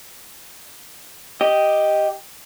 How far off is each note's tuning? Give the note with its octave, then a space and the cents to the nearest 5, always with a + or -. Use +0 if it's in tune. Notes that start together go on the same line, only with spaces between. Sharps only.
G4 +0 D#5 +0